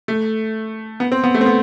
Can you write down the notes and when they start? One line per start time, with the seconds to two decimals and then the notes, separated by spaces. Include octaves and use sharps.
0.08 A3
1.00 B3
1.12 C4
1.24 B3
1.34 A3
1.41 C4
1.46 B3